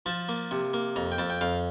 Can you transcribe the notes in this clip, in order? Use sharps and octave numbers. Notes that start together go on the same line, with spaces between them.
F3 A5
A#3
C3
A#3
F2 A#5
G5
F2 A5
G5
F2 F5